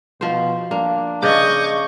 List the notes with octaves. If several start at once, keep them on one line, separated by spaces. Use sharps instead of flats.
B2 F3 C5
A#3 D4
C#3 B4 D#5 C#6 D6 G6